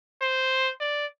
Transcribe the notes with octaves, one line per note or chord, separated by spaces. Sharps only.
C5
D5